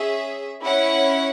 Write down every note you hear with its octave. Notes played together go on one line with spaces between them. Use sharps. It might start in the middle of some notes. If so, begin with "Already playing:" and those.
Already playing: C#4 G#4 E5
C#4 E4 C#5 F#5